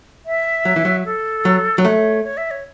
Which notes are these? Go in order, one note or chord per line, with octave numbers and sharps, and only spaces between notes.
E5
F#3
E3
F#3
A4
F#3
F#3
A3 C#5
C#5
E5
C#5